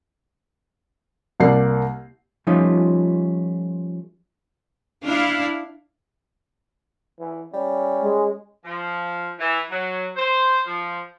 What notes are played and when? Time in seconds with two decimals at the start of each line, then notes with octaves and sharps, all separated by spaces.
1.40 C2 A#3 D5 C7
2.47 F3 G3 A3 C#4 D#4 F4
5.05 D4 E4 F5
7.19 E3
7.53 G3 C#4
8.01 G#3
8.65 F3
9.40 E3
9.71 F#3
10.16 C5
10.67 F3